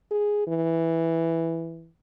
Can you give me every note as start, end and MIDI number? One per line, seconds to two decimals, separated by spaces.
0.11 0.45 68
0.47 1.90 52